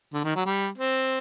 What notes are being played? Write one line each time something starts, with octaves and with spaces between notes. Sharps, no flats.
D3
D#3
F#3
G3
C4